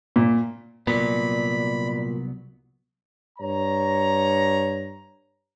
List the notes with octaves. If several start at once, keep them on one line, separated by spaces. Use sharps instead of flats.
A#2
C2 A#2 F#3 B3 D5 B5
G2 C#5 A#5